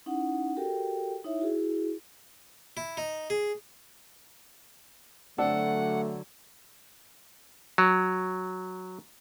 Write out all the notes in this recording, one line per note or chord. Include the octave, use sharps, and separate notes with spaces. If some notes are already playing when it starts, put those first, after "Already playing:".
C#4 D#4 E4 F#5
F#4 G4 A4 A#4 G5
D#4 E4 C#5 E5
E4 F#4 G#4
E4
D#4
G#4
D3 F#3 A3 C4 D4 A4 F#5
F#3